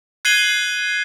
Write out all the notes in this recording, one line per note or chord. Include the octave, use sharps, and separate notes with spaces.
F#6 G#6 C7 D#7 F#7 G7